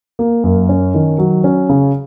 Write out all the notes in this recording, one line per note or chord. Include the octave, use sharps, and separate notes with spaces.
A#3
F#2
C#4
D#3
F#3
C#4
C#3